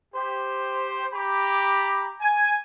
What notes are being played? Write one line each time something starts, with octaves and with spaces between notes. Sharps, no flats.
G4 C5
G4 A#5 B5 D6
G#5